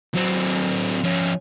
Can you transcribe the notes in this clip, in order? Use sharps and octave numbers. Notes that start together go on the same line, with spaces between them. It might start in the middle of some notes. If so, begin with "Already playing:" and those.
F#3 C4
F3 C#4